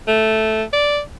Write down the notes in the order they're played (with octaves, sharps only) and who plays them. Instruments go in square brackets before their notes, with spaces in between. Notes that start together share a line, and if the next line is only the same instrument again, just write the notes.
[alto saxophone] A3
D5